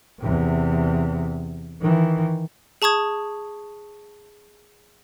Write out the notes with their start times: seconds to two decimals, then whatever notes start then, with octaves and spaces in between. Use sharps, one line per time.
0.20 E2 C3
1.82 D#3 E3
2.82 G#4 A5 C#6 D#6 G#6